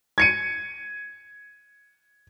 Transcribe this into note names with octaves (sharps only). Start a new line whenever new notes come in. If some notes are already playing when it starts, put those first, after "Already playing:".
G#6 C#7 D#7